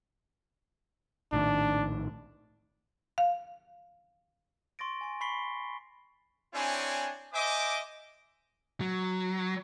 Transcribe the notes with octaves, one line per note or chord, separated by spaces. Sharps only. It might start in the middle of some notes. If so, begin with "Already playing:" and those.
A#1 A2 D#3 D4
F5
C6 C#6 A6 A#6 D7
G#5 C6
B5 C#6 B6 C7 G7
C4 D4 E4 G#4 C#5 G#5
C5 D#5 E5 G#5 D6
F#3